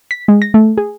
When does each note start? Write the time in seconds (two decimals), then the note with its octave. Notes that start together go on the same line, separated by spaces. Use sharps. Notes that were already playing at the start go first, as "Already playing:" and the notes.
0.11 B6
0.28 G#3
0.42 A#6
0.54 A3
0.78 G#4